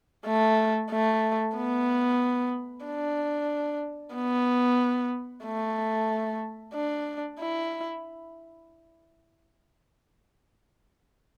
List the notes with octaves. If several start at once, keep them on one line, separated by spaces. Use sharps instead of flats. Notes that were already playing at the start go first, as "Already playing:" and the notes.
A3
A3
B3
D4
B3
A3
D4
E4